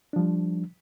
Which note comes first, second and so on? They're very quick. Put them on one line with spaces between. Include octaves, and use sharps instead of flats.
D4 F3 G3